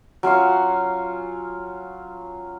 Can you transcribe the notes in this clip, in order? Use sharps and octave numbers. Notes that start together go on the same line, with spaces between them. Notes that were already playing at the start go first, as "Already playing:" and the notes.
F#3 C#4 F4 F5